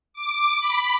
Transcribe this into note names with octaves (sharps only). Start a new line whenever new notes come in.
D6
B5